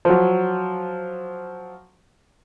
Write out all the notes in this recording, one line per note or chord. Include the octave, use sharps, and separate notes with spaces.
F3 F#3